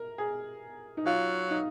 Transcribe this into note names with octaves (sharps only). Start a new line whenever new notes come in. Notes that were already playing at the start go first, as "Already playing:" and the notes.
Already playing: A#4
G#4
D#4
F#3 F4
D#4